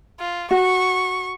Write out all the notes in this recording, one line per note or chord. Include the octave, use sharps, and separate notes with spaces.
F4
F#4 C#6